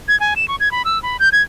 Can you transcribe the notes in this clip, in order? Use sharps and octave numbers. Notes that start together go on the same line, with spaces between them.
G#6
G#5
E7
C#6
G#6
B5
E6
B5
G6
G#6